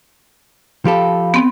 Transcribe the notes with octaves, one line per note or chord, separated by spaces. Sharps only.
F3 G4 A4 F5 B5
B3 C4